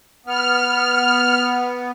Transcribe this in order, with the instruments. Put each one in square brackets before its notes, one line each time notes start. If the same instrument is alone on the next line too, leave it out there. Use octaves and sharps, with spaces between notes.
[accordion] B3 [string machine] F6